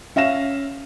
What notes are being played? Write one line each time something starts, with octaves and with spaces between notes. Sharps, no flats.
C#4 E5 F5 A#6 E7